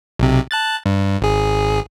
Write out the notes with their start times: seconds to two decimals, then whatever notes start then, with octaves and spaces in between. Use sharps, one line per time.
0.19 B1 C3
0.51 A5 F#6 A6
0.86 G2
1.21 G#1 G#4